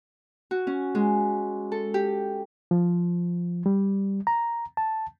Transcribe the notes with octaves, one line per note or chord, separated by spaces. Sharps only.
F#4
C#4
G#3
A4
G4
F3
G3
A#5
A5